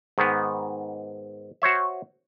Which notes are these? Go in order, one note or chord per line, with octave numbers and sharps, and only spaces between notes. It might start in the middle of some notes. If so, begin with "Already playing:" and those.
G#2 D#3 B3
F#4 C5 C#5 E5